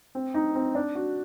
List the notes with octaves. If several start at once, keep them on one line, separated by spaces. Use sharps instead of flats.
C4
D#4
C4
D4
F#4